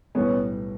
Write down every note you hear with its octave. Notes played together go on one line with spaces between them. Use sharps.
B1 A2 E3 G3 B3 C#4